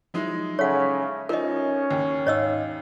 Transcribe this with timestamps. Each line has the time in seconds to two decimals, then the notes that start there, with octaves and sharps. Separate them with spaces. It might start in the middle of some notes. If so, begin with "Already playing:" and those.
0.14 F3 F#3 G#3 D#4 E4
0.59 C#3 A4 C#5 E5 F#5 C#6
1.29 F3 C#4 D#4 A#4 D#5
1.91 D#2
2.27 G#2 D#4 C#5 D#5 F5 E6